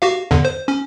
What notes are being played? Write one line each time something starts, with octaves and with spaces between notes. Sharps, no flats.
F#4 G4 F5
E2 G2 D3
C5
C#4